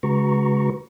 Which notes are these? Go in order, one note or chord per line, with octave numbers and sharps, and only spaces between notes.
C#3 G#3 F#4 B4 A#5 C#6